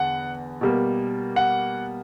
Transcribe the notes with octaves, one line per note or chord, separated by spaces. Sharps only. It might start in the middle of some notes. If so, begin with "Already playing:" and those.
Already playing: E2 D3 F#5
B2 G3 A#3
F#5